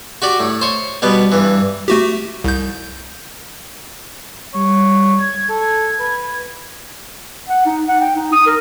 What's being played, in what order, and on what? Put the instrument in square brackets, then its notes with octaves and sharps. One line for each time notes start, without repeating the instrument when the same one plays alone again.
[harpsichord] F#4 G4 D5
A2
C5 C#5
B2 G3 B3
G2 E3
[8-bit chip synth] A3 F#4 G4
C2 G6
[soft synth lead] G3 [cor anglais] C#5
[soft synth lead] G#6
[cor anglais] A4
B4
[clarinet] F#5
D#4
F#5
G5
D#4
D#6
A#4